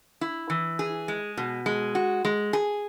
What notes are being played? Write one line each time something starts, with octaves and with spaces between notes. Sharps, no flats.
E4
E3
G#4
G#3
B2
G#3
F#4
G#3
G#4